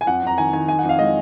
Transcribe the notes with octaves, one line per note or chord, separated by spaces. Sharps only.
G#5
F2 F#5
F2 A#5
D#3 G#5
D#3 G#5
D#4 G#5
F#5
F2
F5
G#3 D#5